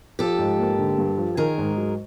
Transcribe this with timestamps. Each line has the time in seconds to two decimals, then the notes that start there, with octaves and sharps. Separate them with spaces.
0.19 F3 G4 A4
0.39 G#2
0.59 A#3
0.79 D3
0.98 G2
1.18 F3
1.37 D#3 G#4 A#4
1.58 G#2
1.77 F#3